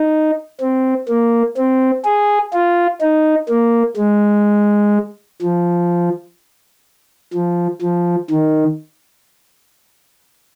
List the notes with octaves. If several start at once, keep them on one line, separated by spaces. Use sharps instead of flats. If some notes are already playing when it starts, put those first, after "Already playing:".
Already playing: D#4
C4
A#3
C4
G#4
F4
D#4
A#3
G#3
F3
F3
F3
D#3